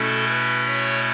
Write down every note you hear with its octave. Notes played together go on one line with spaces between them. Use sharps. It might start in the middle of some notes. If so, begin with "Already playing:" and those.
Already playing: B2 A3 C#4 E4 A4
B4
C#5